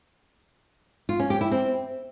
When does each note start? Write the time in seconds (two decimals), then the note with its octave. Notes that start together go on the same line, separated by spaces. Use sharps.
1.09 F4
1.20 C#4
1.30 G4
1.41 E4
1.51 C4